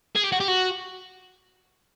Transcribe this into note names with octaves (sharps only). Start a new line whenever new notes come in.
G#4
G4
F#4
G4
F#4